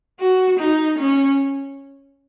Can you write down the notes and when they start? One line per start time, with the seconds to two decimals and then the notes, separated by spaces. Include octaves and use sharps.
0.20 F#4
0.60 D#4
0.99 C#4